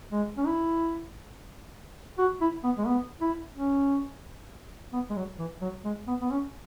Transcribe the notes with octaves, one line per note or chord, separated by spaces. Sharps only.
G#3
C#4
E4
F#4
E4
B3
G#3
B3
E4
C#4
B3
G#3
F#3
E3
F#3
G#3
B3
B3
C#4